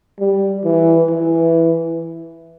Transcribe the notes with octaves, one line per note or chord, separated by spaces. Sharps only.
G3
E3
E3